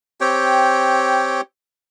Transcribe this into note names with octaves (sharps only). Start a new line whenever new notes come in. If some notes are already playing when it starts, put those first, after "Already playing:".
C4 G4 C#5 G5